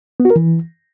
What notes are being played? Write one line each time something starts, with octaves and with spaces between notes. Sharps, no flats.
B3
F#4
A#4
E3